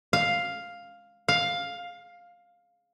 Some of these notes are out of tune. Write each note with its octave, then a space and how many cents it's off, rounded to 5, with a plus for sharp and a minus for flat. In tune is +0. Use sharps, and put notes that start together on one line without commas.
F5 +5
F5 +10